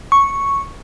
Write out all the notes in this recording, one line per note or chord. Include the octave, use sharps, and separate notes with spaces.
C#6